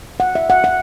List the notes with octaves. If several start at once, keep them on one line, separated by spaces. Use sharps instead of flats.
F#5
E5
F#5
F#5